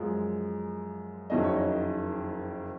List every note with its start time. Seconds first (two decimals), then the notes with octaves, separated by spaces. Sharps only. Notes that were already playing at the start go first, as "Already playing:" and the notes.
Already playing: F#2 F3 G#3
1.30 F#1 F2 D#3 F#3 C#4 D#5
1.43 C#5
1.56 D#5